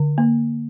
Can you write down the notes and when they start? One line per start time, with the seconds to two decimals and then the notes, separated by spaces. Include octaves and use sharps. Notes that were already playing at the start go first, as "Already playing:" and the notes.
Already playing: D3
0.18 A#3